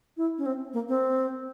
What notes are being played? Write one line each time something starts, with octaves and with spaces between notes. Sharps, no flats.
E4
C#4
C4
A#3
C4